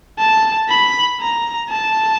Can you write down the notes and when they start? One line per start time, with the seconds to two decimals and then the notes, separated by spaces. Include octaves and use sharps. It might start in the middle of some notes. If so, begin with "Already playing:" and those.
0.19 A5
0.69 B5
1.21 A#5
1.70 A5